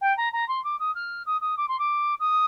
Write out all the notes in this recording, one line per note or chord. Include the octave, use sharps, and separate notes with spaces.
G5
A#5
A#5
C6
D6
D#6
F6
D#6
D#6
D6
C6
D6
D#6